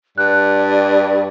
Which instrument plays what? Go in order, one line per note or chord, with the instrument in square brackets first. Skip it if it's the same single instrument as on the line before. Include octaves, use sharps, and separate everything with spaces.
[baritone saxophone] G2 [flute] D5 [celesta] F#6